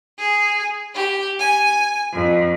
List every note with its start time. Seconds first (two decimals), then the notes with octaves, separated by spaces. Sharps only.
0.17 G#4
0.94 G4
1.40 G#5
2.11 F2